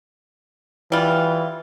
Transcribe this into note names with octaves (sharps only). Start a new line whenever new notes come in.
E3 G3 F4